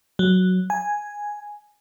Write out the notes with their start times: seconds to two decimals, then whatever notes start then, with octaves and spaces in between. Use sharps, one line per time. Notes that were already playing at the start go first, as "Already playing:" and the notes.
0.19 F#3
0.70 G#5